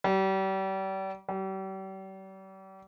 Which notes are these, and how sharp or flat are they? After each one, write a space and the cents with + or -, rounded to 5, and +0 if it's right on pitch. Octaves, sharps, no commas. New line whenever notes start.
G3 -35
G3 -40